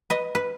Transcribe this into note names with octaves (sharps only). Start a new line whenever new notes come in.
B4 D#5
B4